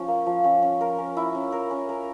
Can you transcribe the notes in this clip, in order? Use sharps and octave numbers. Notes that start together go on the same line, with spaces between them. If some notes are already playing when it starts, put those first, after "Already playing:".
Already playing: F3 C#4
A#3
F3
C#4
C#4
A#4
C#4
E4
C#4
A#4
C#4
A#4